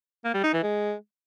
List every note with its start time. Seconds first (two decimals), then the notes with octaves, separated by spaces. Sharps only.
0.24 A#3
0.34 G3
0.44 D#4
0.53 E3
0.63 G#3